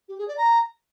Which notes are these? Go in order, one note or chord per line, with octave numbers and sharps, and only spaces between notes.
G4
G#4
D5
A#5